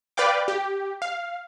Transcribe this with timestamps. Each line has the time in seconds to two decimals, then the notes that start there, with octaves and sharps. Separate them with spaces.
0.17 B4 D5 F5 G5 D6
0.48 G4
1.02 F5